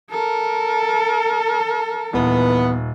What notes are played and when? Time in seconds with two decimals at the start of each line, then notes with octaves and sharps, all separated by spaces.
0.11 A4 A#4
2.13 D#1 E3 B3